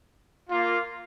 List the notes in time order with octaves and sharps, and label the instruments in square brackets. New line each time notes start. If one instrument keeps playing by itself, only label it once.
[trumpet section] A#3 F4